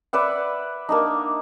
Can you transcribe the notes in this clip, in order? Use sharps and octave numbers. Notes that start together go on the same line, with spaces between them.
B4 D5 E5 F#5
A#3 D4 D#4